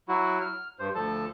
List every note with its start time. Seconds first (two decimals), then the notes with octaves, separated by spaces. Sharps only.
0.09 F#3 E4 F#4
0.41 F6
0.79 G2 C5
0.95 D2 F3 A4 A5